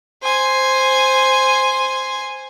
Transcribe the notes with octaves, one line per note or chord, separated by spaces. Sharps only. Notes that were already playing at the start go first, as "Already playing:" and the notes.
C5 G#5